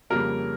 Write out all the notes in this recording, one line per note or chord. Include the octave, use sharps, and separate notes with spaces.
F2 C#3 G3 A#3 A#4